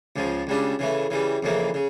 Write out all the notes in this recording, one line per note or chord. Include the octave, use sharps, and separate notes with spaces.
C#2 C#3 F3
C#2 C#3 G3 D4
C#3 E3 A3
C#3 E3 G3
F2 C#3 E3 A#3
C#3